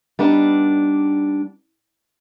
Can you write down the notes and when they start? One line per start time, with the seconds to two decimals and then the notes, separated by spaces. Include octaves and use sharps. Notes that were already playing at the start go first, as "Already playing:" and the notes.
0.19 G3 B3 D4 D#4